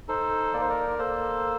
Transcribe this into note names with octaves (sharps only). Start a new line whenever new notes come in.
D#4 A4 C5
A#3 D5
C5
A#4 D5
A#3 A4 C5